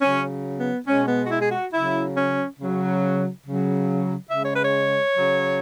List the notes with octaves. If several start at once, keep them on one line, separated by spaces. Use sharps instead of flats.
C#3 F#3 C#4
B3
B2 G#3 C#4
B3
F#4
E4
G#4
F#4
C#3 F#3 E4
C#4
C#3 F#3
C#3 F#3
C#3 G#3 E5
C#5
B4
C#5
C#3 F#3